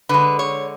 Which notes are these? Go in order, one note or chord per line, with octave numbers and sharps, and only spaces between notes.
D3 G#3 B4
C#5